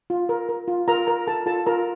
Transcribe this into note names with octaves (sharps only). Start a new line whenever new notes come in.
F4
A#4
A#4
F4
F4 A#4 A#5
A#4 A#5
A4 A#4 A5
F4 A4 A5
F4 A#4 A#5